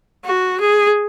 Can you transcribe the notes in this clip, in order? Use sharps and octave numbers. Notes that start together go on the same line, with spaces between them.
F#4
G#4